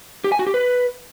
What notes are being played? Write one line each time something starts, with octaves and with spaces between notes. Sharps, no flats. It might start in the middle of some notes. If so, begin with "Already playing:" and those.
G4
G#5
F#4
G4
B4